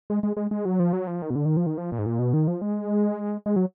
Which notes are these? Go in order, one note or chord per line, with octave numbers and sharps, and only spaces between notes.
G#3
G#3
G#3
G#3
F#3
F3
F#3
F3
D#3
B2
D3
D#3
F3
D#3
F3
A#2
G#2
A#2
B2
D#3
F3
G#3
G#3
F#3